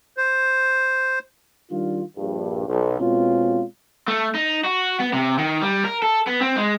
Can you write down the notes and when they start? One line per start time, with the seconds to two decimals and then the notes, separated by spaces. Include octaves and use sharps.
0.17 C5
1.71 D#3 G3 D4 F4
2.17 A#1 G2
2.67 B1
3.00 B2 G#3 C4 C#4 F4
4.08 A3
4.35 D#4
4.64 F#4
5.00 B3
5.13 C3
5.38 D#3
5.61 G3
5.84 A#4
6.02 A4
6.27 B3
6.41 C4
6.56 G#3